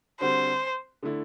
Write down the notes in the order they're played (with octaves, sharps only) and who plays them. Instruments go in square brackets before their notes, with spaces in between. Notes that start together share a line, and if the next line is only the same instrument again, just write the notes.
[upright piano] D3 G3 C4 F#4 [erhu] C5
[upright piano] D3 A3 E4